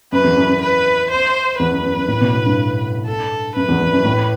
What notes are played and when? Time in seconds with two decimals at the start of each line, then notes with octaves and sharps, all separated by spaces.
0.12 F#2 B4
0.24 E2
0.37 F#2
0.49 F#2
0.61 B4
1.10 C5
1.59 E2 B4
1.72 F#2
1.84 F#2
1.96 F#2
2.08 A2
2.21 B2
2.33 A2
2.46 G2
3.07 A4
3.55 F#2 B4
3.69 E2
3.80 E2
3.93 F#2
4.05 A2